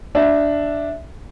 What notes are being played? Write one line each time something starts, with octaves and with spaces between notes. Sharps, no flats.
D4 E5